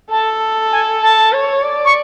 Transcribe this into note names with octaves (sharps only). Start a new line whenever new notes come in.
A4 A5
G#5
A5
C#5
D5
C#6